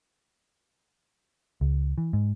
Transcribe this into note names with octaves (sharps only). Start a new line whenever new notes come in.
C#2
E3
G#2